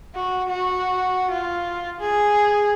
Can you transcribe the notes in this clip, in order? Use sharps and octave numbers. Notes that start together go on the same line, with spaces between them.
F#4
F#4
F4
G#4